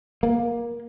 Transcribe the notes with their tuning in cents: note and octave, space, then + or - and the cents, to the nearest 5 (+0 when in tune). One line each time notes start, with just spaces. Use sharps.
A#3 +20